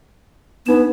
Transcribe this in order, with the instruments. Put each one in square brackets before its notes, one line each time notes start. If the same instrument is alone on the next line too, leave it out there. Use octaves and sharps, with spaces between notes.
[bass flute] B3 [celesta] D4 D#4 E7